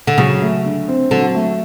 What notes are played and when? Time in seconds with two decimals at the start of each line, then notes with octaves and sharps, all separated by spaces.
0.07 D3
0.18 C#3 F#3
0.42 A3
0.65 D3
0.88 C4
1.11 D3 F#3
1.35 A3